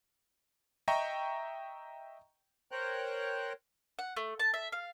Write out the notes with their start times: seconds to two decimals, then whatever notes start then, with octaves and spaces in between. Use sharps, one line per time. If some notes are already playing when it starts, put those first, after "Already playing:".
0.88 D#5 E5 G5 A#5 C#6
2.71 A#4 C5 C#5 G5 A#5 F#6
3.99 F#5
4.17 A3
4.39 A5
4.54 E5
4.72 F5